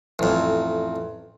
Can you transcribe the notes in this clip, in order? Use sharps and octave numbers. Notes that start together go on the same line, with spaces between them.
A1 F2